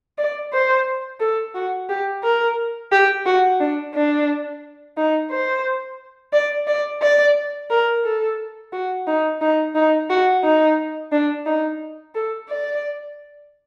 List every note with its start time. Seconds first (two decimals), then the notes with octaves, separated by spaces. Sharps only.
0.18 D5
0.53 C5
1.20 A4
1.55 F#4
1.89 G4
2.23 A#4
2.92 G4
3.26 F#4
3.60 D4
3.94 D4
4.97 D#4
5.31 C5
6.33 D5
6.67 D5
7.02 D5
7.70 A#4
8.04 A4
8.72 F#4
9.07 D#4
9.41 D#4
9.75 D#4
10.10 F#4
10.44 D#4
11.12 D4
11.46 D#4
12.15 A4
12.48 D5